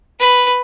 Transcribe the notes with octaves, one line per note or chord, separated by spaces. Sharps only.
B4